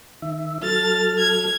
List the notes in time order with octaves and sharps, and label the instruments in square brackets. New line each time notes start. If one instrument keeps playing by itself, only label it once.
[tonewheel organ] D#3 E5
[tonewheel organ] F#3 A4 F6 [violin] A6
[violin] G#6